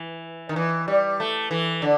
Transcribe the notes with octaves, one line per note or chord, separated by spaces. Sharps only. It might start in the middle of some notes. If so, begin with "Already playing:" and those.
Already playing: E3
D#3
E3
G3
A3
E3
D3